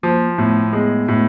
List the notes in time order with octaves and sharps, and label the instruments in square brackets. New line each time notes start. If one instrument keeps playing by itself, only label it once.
[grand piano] F3 [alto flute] A#3
[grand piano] A2 [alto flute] B3
[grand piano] G#3 [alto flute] B3
[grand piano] A2